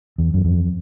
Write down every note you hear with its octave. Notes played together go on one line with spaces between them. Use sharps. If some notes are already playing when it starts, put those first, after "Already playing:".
E2
F#2
F2